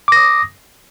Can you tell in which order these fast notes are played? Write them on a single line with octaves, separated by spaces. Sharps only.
D6 A#6 D#6